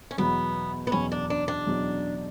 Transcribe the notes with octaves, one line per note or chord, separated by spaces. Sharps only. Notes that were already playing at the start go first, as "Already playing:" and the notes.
C#4
E2 B2 F#3 B3
B3
E2 B2 F#3 C#4
D4
D4
D4
E2 B2 F#3